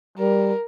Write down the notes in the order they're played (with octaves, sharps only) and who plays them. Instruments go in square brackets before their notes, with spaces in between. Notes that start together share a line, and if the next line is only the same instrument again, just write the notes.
[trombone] G3 [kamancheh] A#4